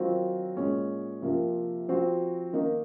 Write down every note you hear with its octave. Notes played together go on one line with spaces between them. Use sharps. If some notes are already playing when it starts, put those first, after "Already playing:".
Already playing: D#3 F#3 C4 F4
A#2 G#3 C#4
C3 F3 A#3
F3 C4 F#4
D#3 A#3 D#4